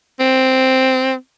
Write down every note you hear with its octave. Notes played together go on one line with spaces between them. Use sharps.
C4